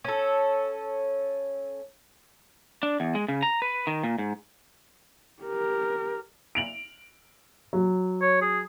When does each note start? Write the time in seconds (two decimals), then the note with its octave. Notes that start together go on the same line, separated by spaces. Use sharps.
0.05 C#4 A4
2.83 D4
3.00 E2
3.15 G#3
3.28 C#3
3.43 A#5
3.62 B4
3.87 D#3
4.04 A#2
4.18 G#2
5.43 G4 A#4
6.55 D7 F7 F#7
7.73 F#3
8.21 C#5
8.41 G#4